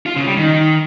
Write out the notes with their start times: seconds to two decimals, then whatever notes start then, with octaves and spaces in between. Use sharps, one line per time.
0.06 F4
0.16 C#3
0.27 G3
0.37 D#3